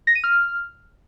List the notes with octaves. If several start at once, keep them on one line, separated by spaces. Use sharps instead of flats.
A#6
D#7
F6